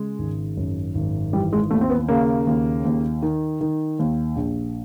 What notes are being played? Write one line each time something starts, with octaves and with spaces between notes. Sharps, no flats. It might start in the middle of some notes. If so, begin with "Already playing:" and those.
Already playing: C#3 G#3
G#1
F#2
G#1
E3 G3
G#3
D#2 A3
C4
B3
C#3 A#3
D#2
D#2
D#3
D#3
D#2
A#1